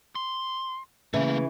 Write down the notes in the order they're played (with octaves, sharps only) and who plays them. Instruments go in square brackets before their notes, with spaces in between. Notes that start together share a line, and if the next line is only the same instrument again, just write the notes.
[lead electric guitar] C6
[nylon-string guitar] C#3 E3 [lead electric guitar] A3 A#3